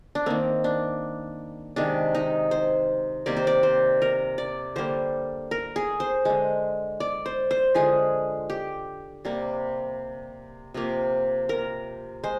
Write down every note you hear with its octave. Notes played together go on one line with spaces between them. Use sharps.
D4
D#3 A#3 C4
D4
C3 D#3 G#3 D4
D#4
C5
C3 D#3 G3 A#3 D5
C5
D5
C5
A#4
D5
D3 G3 A#3 C5
A#4
G#4
C5
D3 G#3
D5
C5
C5
D3 F3 G#3 G#4
G4
C3 G3 A#3
C3 F3 A#3
A#4
G#3 C5